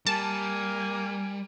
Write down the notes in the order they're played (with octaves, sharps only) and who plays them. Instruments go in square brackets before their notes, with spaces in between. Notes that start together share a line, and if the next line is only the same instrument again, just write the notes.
[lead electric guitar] G3 [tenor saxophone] A#3 [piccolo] G#5 [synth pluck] A5